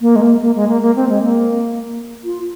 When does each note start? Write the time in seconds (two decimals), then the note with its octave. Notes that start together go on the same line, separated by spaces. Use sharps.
0.01 A#3
0.16 G#3
0.22 A#3
0.42 A#3
0.56 G#3
0.69 A#3
0.82 A#3
0.96 C4
1.09 G#3
1.23 A#3
2.24 F4